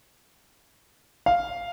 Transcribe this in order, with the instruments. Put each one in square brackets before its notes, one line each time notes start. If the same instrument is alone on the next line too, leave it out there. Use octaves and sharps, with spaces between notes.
[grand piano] F5